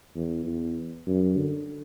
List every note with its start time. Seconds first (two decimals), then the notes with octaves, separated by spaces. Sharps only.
0.16 E2
0.46 E2
1.07 F#2
1.37 D3